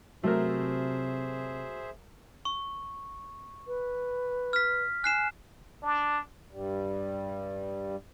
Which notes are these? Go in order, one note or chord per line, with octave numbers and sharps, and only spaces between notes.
C3 F#3 A3 G#4 A#4 C5 E5
C#6
B4
F6 B6
G#5 F#6 C7 E7
D4
G2 G3